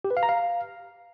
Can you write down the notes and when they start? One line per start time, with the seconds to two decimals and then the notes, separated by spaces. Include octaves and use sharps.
0.05 G4
0.11 B4
0.17 F5
0.23 A#5
0.29 F5